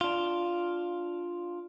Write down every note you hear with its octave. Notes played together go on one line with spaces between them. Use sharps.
D4 F4